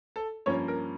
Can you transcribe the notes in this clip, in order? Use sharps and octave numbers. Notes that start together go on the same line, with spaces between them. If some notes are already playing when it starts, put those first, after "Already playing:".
A4
G2 F3 A#3 C#4 C#5
A#4